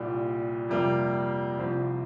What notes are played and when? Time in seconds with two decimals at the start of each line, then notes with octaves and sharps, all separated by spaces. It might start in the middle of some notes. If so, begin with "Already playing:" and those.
Already playing: C2 A#2 G3
0.69 F2 C3 G3 A#3 F4
1.58 C2 C3 F3 C4